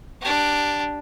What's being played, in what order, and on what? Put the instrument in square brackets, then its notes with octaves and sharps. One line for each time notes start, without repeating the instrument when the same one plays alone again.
[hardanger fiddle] D4 G4